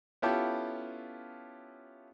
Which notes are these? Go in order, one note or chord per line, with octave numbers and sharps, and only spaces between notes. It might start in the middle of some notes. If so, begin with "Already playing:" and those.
B3 C#4 E4 F4 G4 A4